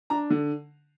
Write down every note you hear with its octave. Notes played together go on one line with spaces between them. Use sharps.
D4 A#5
D3